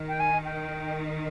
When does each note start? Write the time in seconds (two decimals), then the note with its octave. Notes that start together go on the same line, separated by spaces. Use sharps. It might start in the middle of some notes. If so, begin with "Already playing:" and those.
Already playing: D#3
0.09 G5
0.20 G#5
0.45 G5